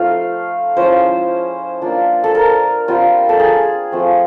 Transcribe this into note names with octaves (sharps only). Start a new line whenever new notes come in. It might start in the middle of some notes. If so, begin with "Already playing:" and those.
Already playing: F3 A3 C4 D#4 F5
F3 G#3 C#4 E4 C5
A#3 D4 F4
A4
A#4
G3 C4 F4
A4
G#4
F3 A3 C4